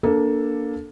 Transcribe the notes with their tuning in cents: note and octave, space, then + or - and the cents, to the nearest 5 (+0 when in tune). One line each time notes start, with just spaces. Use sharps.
A#3 +20 D4 -5 A4 +0